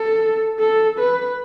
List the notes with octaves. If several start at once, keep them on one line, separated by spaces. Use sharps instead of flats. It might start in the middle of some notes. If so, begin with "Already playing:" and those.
Already playing: A4
A4
B4